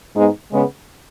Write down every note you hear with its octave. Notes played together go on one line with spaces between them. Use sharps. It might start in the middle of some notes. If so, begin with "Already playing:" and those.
G#2 G#3 B3 D#4
C#3 G#3 B3